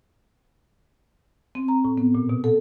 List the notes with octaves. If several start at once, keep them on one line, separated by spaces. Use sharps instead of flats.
C4
A#5
A2
B3
A#2
B2
A4